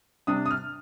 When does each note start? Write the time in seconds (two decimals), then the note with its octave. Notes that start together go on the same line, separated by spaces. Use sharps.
0.27 C3 G3 D4 D#6
0.46 D#6
0.51 F6